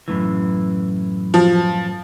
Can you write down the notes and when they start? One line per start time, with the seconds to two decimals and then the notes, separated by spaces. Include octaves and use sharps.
0.08 F#2 A2 E3
1.34 F3